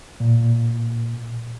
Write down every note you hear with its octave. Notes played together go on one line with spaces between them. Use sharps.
A#2